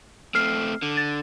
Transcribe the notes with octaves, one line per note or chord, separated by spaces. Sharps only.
A3 C4 F6 C7
D3
A6